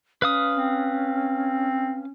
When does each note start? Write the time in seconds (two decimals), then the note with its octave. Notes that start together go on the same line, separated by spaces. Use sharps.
0.22 C#4 B4 F5 D#6
0.57 C4